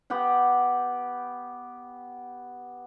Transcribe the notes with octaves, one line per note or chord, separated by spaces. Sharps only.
B3 G4 F#5 G5